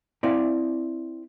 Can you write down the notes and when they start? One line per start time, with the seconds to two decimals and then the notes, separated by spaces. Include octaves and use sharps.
0.23 C4 E4 D5 F5